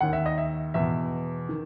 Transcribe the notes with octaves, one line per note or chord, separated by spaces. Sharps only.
D#2 D#3 F#5
E5
D#5
E5
E2 B2 E5
D#3